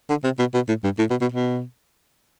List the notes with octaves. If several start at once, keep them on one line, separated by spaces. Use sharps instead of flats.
D3
C3
B2
B2
A2
G2
A2
B2
B2
B2